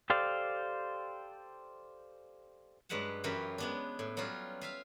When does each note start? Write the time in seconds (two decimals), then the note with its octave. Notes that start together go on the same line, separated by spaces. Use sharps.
0.10 G4 A4 C5 D5 F5
2.89 G2 F#3 G#3 B4 F#5 A5
3.24 F#2 E3 F#3 F4 G4 B4
3.58 G#3 B3 D4
3.99 A2
4.17 F#3 G3 B3 C#4 F4
4.61 F4 E5 F5